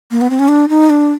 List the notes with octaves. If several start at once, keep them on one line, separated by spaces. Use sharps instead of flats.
A#3
B3
C4
C#4
D4
D#4
D4